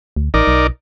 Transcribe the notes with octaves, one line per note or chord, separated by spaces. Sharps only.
D2
A1 D#4 A#4 D5
B1